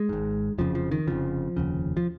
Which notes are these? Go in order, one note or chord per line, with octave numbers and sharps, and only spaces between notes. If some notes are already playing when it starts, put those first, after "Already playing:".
Already playing: G#3
G#1 G#2
F1 F2 C#3 F3
F3
D#3
F1 F2 C#3 F3
F1 D#2 C#3
F3